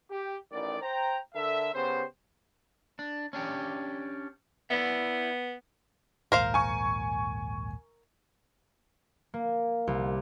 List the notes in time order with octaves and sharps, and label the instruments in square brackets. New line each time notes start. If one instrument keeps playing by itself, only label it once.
[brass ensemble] G4
A1 D#3 D5
C5 G5 A#5
D3 A4 A#4 E5
C#3 B3 G4 C5
[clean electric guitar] D4
C#4 D4 G4
[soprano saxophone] B3 [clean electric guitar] E4 D5 E5
[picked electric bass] A#1 D#2 G#2 [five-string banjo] A#4 C5 F5
[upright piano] G#5 C#6
[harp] A#3
C2